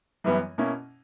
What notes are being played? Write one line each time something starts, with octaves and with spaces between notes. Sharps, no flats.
F#2 E3 G3 B3 E4
B2 A#3 C#4 E4